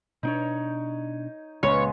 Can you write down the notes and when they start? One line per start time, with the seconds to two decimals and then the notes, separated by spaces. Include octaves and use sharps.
0.23 B2 C4 D4 D#4 C#5
1.63 C#2 A#2 C#3 G#3 B3 C#5